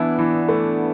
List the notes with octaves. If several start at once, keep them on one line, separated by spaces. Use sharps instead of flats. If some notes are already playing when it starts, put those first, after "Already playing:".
Already playing: E3 B3 D4 E4
E3
A3